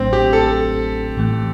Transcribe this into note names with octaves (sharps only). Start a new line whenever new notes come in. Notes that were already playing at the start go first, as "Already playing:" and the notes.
Already playing: A1 A2 F#3 A3 C4 D4
G4
A4
A2 E3 A3